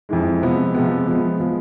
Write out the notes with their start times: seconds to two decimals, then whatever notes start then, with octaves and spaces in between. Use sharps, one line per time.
0.09 F2 E3 G#3
0.42 C3 F3 G#3 B3
0.75 C3 F3 G#3 B3
1.07 F3 G#3 B3
1.40 F3 G#3 B3